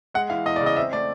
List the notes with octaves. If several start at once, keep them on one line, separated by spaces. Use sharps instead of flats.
G#3 F#5
E3 F5
E2 D#5
D5
C#3
D#5
C4 E5
A3 D5